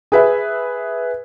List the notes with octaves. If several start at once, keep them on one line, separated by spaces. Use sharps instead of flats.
G#4 B4 E5